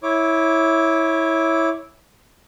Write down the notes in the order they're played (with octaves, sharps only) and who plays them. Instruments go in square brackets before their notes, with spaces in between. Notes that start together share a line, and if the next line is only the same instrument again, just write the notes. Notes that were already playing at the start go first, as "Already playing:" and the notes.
[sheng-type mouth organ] E4 C#5 D6